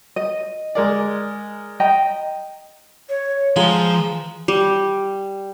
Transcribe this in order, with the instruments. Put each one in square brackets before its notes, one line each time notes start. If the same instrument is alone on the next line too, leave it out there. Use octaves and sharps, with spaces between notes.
[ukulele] D#5
[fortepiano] G#3 A#4 D5
[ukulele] D#5 G5 A#5
[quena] C#5
[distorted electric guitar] F3 [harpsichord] G#3 [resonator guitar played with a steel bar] F4 [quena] A#5
[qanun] G3